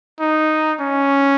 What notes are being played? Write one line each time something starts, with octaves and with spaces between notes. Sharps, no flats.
D#4
C#4